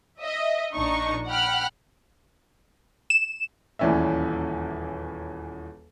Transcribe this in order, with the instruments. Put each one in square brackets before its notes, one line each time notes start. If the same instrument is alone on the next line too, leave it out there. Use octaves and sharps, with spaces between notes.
[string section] D#5 E5
A#1 D4 D#4 C#6
F#5 G5 B5 F6 F#6
[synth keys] E7
[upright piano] D#1 E2 E3 C#4 D5 E5